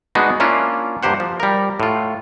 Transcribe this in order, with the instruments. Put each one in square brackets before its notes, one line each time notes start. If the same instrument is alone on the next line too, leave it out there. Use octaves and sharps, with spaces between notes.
[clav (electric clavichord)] G#3 B3 D4 D#4 F#4
A#3 C#4 D4 E4 F4
G2 A#3 G4 C5 F#5
F3
G3 A#4
A2 F4